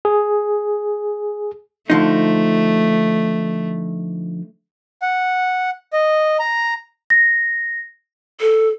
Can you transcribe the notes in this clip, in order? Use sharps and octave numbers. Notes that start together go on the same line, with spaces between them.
G#4
D3 F3 A3 D#4
F#5
D#5
A#5
A#6
A4